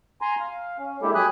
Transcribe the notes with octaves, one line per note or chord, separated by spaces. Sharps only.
G#5 A#5 C6
F5
C#4
G#3 A#3 D4 E4 G4 A4
F#3 G4 G#5 B5 D#6 F#6